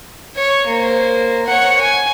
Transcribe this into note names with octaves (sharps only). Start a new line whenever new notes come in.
C#5
A#3 C5
C#5 F#5
G#5